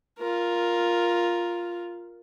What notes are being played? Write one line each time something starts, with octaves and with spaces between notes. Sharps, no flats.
F4 A#4